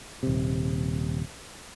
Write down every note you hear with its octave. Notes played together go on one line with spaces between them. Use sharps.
D#1 C3